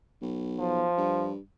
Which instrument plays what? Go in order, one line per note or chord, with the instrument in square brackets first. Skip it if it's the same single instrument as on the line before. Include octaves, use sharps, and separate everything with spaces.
[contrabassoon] B1
[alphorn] F3
[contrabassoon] G2